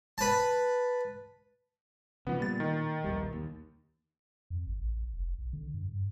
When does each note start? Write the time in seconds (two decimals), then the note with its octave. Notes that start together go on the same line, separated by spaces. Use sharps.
0.18 B4 A5
2.27 C#3 F3 B3
2.40 A#2 G3 A6
2.60 D#3
3.04 A#1 D#2 G3
3.33 D#2
4.50 F2
4.67 G#1
4.81 A1
5.14 F1
5.39 B1
5.53 D3
5.74 G2
5.87 G2